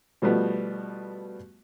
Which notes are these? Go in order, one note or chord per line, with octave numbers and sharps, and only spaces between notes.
B2 F3 G3 A3 B3